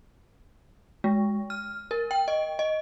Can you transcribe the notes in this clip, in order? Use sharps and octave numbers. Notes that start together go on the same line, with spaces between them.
G#3
F6
A#4
G5
D#5
D#5